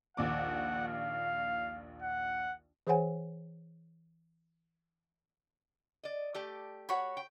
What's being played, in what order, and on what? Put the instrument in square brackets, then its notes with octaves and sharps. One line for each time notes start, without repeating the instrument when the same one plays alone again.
[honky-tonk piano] A#1 D#2 D6 [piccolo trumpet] F#5
[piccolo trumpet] F5
F#5
[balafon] E3 G#4 C5 C#5 F#5 G#5
[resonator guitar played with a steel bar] D5 D#5
A3 G4 D5
[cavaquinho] F#4 C#5 B5
[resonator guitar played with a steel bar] G5